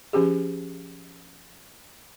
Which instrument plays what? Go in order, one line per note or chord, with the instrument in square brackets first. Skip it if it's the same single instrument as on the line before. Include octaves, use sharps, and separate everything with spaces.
[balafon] F3 C#4 G4 G#4